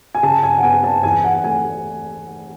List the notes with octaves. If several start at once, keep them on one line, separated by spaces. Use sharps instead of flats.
G#5
C#3 A5
G#5
F#5
B3 G#5
A5
E2 G#5
F#5
A3 G#5